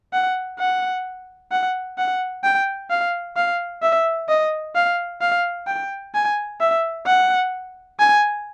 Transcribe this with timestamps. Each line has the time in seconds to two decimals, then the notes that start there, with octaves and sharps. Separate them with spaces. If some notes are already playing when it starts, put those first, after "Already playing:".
0.13 F#5
0.59 F#5
1.52 F#5
1.98 F#5
2.44 G5
2.90 F5
3.36 F5
3.82 E5
4.29 D#5
4.75 F5
5.21 F5
5.67 G5
6.14 G#5
6.60 E5
7.06 F#5
8.00 G#5